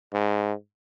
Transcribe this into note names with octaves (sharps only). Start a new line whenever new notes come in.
G#2